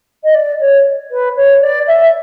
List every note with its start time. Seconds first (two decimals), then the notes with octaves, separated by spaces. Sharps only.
0.24 D#5
0.34 D5
0.60 C#5
1.11 B4
1.36 C#5
1.62 D5
1.87 E5